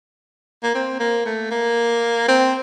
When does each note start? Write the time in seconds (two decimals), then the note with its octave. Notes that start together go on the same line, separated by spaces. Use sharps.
0.63 A#3
0.75 C4
1.00 A#3
1.26 A3
1.51 A#3
2.28 C4